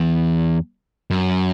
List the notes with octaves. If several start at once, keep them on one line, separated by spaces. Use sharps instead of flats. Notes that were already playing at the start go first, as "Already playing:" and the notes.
Already playing: E2
F#2